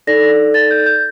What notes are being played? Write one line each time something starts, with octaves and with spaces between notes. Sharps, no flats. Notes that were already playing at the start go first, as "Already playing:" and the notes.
D#4 A4 D5 A#6
A6
G6
G6